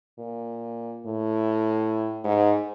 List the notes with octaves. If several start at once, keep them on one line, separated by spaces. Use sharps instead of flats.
A#2
A2
G#2